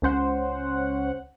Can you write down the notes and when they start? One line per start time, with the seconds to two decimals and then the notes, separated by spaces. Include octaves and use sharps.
0.02 C#2 C#4 C5 F#5